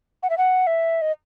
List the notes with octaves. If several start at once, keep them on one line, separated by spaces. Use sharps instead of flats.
F#5
E5
F#5
E5
D#5